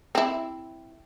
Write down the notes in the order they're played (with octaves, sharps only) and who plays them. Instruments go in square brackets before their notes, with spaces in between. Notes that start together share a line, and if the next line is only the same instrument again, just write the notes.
[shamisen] C4 E4